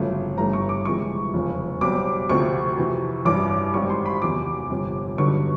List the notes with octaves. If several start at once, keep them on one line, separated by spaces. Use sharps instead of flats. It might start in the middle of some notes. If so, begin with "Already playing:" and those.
Already playing: G1 F2 C#3 F#3 A3
G1 G2 E3 A3 A#5
C#6
D6
G1 F2 C3 E3 G#3 C#6
F1 E2 C#3 F3
B1 B2 G3 C4 D6
D2 C3 F3 A3 C4 C#6
F2 C3 E3
A1 G2 E3 G3 D6
G#1 F#2 D#3 G3 C4 C#6
C6
B5
E2 C3 D#3 F#3 D6
G1 F2 C3
G2 D3 F#3 B3 D#4 C#6